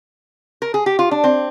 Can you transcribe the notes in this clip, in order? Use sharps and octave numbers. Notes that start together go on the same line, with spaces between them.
A#4
G#4
G4
F4
D4
C4